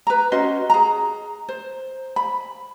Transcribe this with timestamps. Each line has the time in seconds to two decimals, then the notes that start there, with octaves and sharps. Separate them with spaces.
0.07 B4 A#5
0.32 C#4 F#4 C5 D#5
0.70 G#4 A#5
1.49 C5
2.16 B5